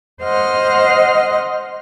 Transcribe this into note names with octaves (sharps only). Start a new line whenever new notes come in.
C5 D#5 F#5 F6